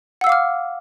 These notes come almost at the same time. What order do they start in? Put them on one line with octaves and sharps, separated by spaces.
F#5 E6 F5 D6 F6